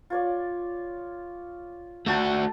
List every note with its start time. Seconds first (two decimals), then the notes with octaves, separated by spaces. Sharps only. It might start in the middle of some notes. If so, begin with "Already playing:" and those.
0.10 F4 C#5 D5
2.06 A3 F#4 G5 A5 A#5